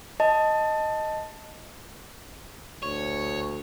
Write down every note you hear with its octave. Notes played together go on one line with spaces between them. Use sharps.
D#5 A5
D2 C#5